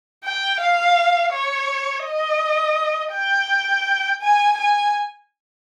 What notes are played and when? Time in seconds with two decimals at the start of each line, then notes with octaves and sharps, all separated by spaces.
0.24 G5
0.60 F5
1.33 C#5
2.05 D#5
3.13 G5
4.22 G#5
4.58 G#5